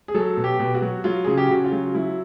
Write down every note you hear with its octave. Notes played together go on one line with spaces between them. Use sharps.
G#4
F#3 A4
B2
G4
B2
F#4
F#3
F#3 F4
C#3 G#4
G4
C#3 F#4
F4
F#3
F#3 E4